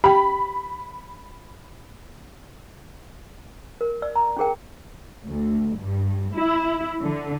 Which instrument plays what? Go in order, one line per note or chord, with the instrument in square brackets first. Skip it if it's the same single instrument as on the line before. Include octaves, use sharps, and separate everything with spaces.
[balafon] G4 G5 [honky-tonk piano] B5
[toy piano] A#4
D5 E6
A#5
C#4 D4 G#4 A#4 G5
[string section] D2
G2
E4
D3